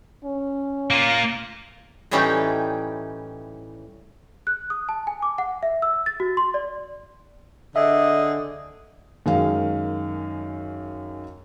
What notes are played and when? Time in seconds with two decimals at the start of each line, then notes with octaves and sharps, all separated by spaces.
0.24 C#4
0.90 A#3 F4
2.11 A2 E3 G3 C#4 D#4 G5
4.47 F#6
4.70 D#6
4.89 A5
5.07 G#5
5.22 D6
5.38 F#5
5.63 E5
5.82 E6
6.06 A6
6.20 F#4
6.37 C6
6.54 D5
7.76 D3 G#4 D#5 E5
9.26 F#2 D#3 G#3 G#4 F5